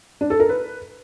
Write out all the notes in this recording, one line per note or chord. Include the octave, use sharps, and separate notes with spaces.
D4
A4
A#4
B4